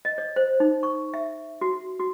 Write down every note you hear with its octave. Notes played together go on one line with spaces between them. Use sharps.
D#5
C#5
C5
D#4
C#6
E5
F#4
F#4